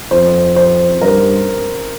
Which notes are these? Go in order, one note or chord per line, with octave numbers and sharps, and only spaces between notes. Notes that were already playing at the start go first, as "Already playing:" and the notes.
F2 C5
C5
G2 A#4